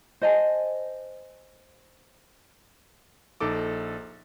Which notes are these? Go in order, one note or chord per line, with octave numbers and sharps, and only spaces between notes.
C5 D#5 G#5 A5
A#1 D#4 A4 D6